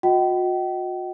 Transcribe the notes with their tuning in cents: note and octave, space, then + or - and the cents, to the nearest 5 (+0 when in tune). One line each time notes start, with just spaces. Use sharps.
F#4 -40 D#5 +15 G5 -40